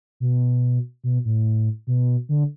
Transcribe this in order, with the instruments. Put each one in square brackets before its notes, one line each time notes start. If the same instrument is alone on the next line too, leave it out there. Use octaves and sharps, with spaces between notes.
[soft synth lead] B2
B2
A2
B2
D3